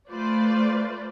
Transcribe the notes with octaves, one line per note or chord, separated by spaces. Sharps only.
A3 F4 B4 C5 D5